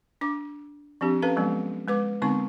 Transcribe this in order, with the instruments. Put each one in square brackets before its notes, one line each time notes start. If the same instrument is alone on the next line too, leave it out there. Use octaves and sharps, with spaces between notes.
[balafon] D4 D6
F3 C4 D4 G4
C#4 A4 B4 F5 A#5
F3 F#3 G#3 B3
G#3 B4 D6
D3 G#3 B3 C4 D#4 C#6